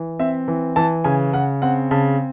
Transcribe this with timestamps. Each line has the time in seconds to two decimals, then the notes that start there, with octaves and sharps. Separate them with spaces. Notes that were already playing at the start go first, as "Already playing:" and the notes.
Already playing: E3
0.20 C4 E5
0.48 E3
0.76 E3 A5
1.04 C#3 G#5
1.33 C#3 F#5
1.62 C4 F#5
1.91 C#3 A5